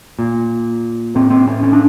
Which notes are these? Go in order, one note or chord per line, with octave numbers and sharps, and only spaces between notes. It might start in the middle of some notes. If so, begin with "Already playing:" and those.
A#2
A2 C4
C4
C#4
C#4
D4